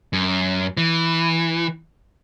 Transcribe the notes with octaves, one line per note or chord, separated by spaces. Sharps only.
F#2
E3